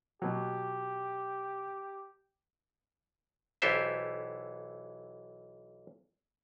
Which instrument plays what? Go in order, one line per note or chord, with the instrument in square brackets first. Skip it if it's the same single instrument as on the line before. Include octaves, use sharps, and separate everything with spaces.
[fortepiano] B2 F#3 [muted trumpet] G4
[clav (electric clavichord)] B1 E3 G4 A4 C5 E5